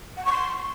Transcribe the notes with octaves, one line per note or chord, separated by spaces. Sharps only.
F#5
C#6
C6